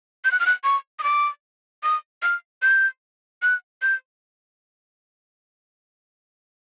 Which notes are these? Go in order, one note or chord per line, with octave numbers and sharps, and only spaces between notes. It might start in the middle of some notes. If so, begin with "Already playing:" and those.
G6
F#6
F6
F#6
C#6
D#6
D6
D#6
F6
G6
F#6
G6